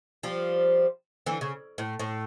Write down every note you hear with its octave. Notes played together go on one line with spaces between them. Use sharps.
F3 G3
D3 E3
C#3
A2
A2